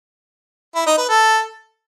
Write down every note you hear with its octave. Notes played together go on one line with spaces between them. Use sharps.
E4
D#4
B4
A4